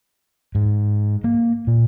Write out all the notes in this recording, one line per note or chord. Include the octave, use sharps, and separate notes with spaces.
G#2
A#3
A#2